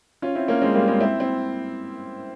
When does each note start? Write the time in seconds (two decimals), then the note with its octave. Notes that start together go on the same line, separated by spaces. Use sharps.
0.22 C#4 F4
0.35 C4 E4
0.48 A#3 C#4
0.62 G#3 C4
0.75 G3 A#3
0.88 G#3 C4
1.00 C4 E4
1.20 C4 E4